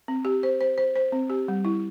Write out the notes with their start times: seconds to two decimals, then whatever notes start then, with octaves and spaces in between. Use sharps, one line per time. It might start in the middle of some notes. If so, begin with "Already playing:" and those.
0.08 C4
0.25 G4
0.43 C5
0.61 C5
0.78 C5
0.96 C5
1.12 C4
1.30 G4
1.48 G3
1.65 E4